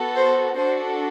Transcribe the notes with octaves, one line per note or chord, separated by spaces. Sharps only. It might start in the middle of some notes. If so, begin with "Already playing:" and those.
Already playing: B3 F#4 A4
C5
D4 F#4 A4 C5